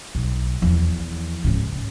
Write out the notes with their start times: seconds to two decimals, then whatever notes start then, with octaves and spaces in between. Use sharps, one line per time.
0.15 B1
0.62 E2 F3
1.44 G#2 C#3